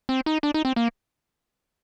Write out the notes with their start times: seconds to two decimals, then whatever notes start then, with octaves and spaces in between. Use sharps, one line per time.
0.09 C4
0.26 D#4
0.43 D4
0.54 D#4
0.65 C4
0.76 A#3